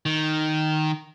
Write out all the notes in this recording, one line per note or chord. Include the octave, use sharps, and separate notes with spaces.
D#3